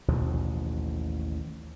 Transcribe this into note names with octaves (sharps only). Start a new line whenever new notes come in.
A1 D#2 B2 F3